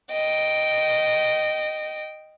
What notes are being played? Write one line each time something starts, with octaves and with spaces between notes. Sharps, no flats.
D#5 G5